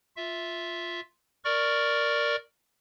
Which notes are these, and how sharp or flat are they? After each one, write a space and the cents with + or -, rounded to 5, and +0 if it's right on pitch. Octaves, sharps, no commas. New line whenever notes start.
F4 +0 E5 +0
A#4 +0 D5 +0 C#6 +0